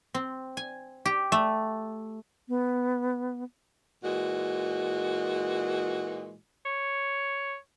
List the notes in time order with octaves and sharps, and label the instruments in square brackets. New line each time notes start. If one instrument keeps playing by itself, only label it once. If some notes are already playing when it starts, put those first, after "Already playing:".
[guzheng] C4
G#5
G4
A3
[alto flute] B3
[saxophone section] A#2 E3 G#3 F#4
[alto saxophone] C#5